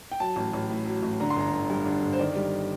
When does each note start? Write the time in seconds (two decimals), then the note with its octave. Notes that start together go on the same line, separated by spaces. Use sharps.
0.12 G5
0.20 F#3 A5
0.36 A1
0.53 A1
0.70 A2
0.86 F#3
1.02 A1
1.20 D3 A#5
1.30 C6
1.36 G1 A#5
1.53 G1
1.70 G2
1.85 D3
2.02 G1
2.13 C5
2.19 D#3 D5
2.36 G3